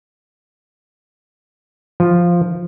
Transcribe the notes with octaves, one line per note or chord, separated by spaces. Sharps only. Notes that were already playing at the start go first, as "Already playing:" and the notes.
F3